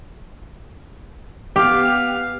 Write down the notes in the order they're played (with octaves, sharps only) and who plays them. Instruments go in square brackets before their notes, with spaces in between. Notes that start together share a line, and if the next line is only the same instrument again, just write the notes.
[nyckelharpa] B3 F5 [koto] G4